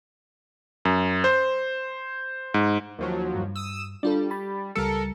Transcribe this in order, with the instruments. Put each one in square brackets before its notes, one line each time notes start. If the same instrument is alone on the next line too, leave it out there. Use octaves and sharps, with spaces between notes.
[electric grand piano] F#2
C5
G#2
[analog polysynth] D#2 F3 F#3
[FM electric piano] G2
[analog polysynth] D#6 E6
[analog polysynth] G3 [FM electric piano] D4 F4 A4
[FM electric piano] B5 A6
[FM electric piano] C#2 G3 C#7 [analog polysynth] A4 A#4